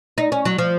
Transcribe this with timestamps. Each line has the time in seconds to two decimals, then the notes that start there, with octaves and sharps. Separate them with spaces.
0.18 D#4
0.32 C#4
0.45 F#3
0.58 F3